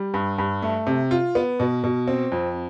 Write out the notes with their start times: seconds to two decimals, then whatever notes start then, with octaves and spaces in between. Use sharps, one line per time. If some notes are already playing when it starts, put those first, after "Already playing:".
Already playing: G3
0.14 G2
0.38 G2
0.62 A3
0.87 C3
1.11 F4
1.35 B3
1.60 B2
1.84 B2
2.07 C4
2.32 F2